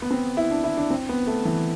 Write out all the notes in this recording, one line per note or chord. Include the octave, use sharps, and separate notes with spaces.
B3
C4
E4
D4
E4
D4
C4
B3
A3
E3